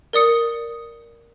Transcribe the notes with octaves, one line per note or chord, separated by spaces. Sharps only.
A#4 D5 D#6 C#7